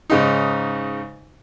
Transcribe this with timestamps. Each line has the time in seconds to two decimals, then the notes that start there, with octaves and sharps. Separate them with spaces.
0.10 G#2 C#3 D#4